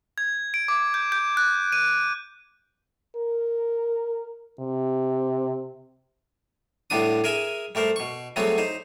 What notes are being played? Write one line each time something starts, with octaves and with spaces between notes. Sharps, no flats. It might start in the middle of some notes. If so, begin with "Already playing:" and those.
G#6
D7
D6
G6
G6
F#6
D#7
A#4
C3
A2 G3 B3 D4 D#6
G#4 A#4 E5 G#5
G3 A3 A#4 C5
B2 C#6
F#3 G3 A3 B3 C4 G#4
D#4 C5